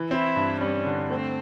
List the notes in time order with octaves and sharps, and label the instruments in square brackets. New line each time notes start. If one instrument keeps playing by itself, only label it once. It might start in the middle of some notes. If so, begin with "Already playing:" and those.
Already playing: [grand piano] E3
[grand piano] C4 [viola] E4
[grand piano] G2
[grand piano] G3 [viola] C#4
[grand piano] D3
[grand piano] A3 [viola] C4